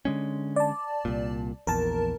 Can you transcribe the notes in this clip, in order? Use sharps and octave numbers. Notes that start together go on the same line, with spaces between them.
D3 G#3 C#4
D5 A5
C2 A#2
A#1 E2 A#4 A5